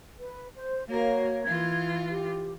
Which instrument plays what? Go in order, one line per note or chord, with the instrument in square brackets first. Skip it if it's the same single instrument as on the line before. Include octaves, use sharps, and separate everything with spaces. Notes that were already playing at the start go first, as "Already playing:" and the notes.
[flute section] B4
C5
[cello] A#3 A#4 [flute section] F#4 C#5 F5
[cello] E3 F4 [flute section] G#6
[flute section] G4